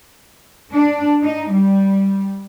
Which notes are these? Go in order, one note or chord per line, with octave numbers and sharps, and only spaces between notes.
D4
D#4
G3